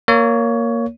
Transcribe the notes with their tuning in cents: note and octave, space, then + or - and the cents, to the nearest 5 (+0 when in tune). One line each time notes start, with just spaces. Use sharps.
A#3 +0 C#5 +15